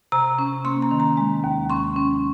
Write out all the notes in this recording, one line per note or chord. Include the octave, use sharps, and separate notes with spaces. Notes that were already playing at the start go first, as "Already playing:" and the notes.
C3 A#5
C#4
A#3 C6
A#5
D#3
A#5
G#3
D#2
C#4 C6
C#4